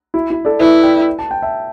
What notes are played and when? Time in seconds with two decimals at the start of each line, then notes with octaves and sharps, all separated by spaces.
0.14 E4
0.30 E4
0.45 A4 D5
0.60 E4 B4 E5
0.83 D5 G5
1.19 A5
1.31 G5
1.42 E5 A5